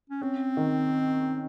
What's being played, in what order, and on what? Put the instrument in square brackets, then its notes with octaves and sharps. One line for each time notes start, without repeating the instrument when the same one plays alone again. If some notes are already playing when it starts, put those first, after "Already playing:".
[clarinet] C#4
[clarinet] C4 [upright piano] C#4
[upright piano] D#3